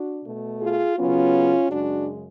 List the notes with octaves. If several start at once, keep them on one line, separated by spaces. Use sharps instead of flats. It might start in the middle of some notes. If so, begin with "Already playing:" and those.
Already playing: D4 F#4
B2 A3
F4 G#4
C#3 F#3 B3 C#4 F4
F#2 C#3 G#3 D4 F#4